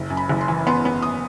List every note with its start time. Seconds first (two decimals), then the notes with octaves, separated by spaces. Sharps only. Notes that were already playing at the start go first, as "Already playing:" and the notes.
Already playing: F#1
0.10 F#2
0.17 B5
0.29 F#1
0.41 C6
0.48 E3
0.67 B3 C6
0.85 B3
1.02 D#6